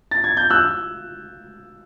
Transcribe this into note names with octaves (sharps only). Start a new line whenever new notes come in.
A6
G#6
G6
E6 F#6